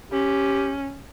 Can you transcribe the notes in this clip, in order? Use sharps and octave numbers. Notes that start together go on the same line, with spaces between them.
C#4 G4